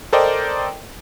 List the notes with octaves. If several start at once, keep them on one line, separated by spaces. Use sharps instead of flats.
A4 A#4 C5 D5 D#5 G5